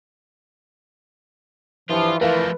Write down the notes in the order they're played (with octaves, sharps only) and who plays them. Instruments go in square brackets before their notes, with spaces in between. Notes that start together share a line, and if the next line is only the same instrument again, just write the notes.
[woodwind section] G2 F3 [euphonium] E3 [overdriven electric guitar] F4
[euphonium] E3 [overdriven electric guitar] F3 A3 [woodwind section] F4 A#4 [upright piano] B4